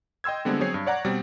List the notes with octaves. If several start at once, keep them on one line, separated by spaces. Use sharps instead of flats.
D#5 G5 C6 E6 G#6
D3 G3 G#3 B3 C4 D4
F#3 C4 G#4 C#5 G#6 C7
G2
C#5 D5 F#5 A#5
B2 G3 C4